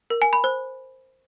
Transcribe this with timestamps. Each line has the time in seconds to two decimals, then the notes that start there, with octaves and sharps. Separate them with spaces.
0.10 A#4
0.22 G#5
0.33 B5
0.44 C5